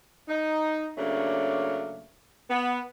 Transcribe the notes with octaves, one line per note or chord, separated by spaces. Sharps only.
D#4
C#3 F#3 A3 A#3 C#4 D4
B3